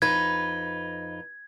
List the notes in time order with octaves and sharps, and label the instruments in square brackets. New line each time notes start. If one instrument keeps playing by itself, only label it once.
[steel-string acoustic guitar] F2 D#4 B4 [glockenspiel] G#6